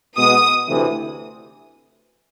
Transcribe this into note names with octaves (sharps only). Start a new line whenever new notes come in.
B2 G#3 B3 D#6
D2 C3 E3